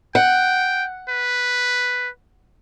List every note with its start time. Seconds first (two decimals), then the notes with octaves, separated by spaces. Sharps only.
0.15 F#5 G5
1.09 B4